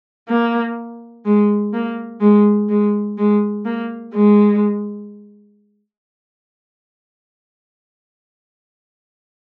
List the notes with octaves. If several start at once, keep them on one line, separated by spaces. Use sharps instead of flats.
A#3
G#3
A#3
G#3
G#3
G#3
A#3
G#3